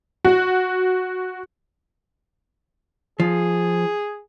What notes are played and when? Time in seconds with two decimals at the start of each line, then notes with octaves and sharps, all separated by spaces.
0.25 F#4
3.20 F3 G#4